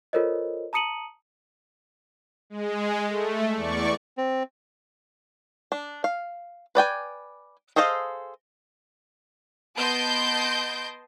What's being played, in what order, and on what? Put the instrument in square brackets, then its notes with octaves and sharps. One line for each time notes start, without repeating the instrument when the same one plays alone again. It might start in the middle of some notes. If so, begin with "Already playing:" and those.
[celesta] F4 A4 A#4 C5 C#5 D#5
A5 A#5 D#6 C#7 D#7 F#7
[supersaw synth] G#3
A3
E2 D5 C#6
[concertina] C4
[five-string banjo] D4
F5
B4 D5 G5 G#5
G#4 A4 C5 D#5 F5
[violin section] B3 D#5 A5 C6 G6 D7